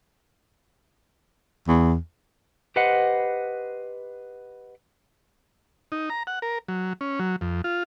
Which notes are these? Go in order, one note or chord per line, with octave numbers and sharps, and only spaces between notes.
E2
G4 B4 C5 D#5 F#5
D#4
A#5
F#5
A#4
F#3
C#4
F#3
F2
F4